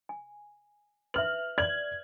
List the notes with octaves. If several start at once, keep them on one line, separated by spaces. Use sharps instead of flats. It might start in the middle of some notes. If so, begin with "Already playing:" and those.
G#5
B4 E5 F6 F#7
D5 G#6 F#7